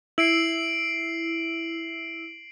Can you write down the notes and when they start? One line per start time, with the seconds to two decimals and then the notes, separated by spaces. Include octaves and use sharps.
0.18 E4 C7 D7 F#7